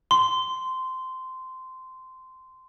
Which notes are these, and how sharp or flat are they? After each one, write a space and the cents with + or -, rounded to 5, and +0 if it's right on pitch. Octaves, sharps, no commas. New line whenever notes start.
C6 -15